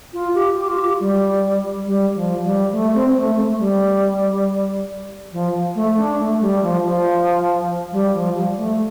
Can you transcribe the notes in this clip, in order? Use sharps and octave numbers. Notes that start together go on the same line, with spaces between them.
F4
G4
G4
F4
G4
G3
G3
F3
G3
A3
C4
C4
A3
A3
G3
F3
A3
D4
A3
G3
F3
F3
G3
F3
G3
A3